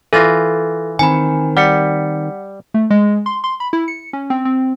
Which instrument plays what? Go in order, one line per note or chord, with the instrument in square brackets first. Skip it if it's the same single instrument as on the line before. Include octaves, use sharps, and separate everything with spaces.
[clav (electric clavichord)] E3 F4 [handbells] A4 A6 A#6
[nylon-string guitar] D#3 C4 [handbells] G#5 B5
[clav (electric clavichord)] G3 [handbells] F#5 B6 C#7
[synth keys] A3
G#3
C6
C6
B5
E4
C#7
C#4
C4
C4